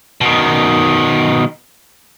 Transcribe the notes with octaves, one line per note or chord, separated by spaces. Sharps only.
B2 D#3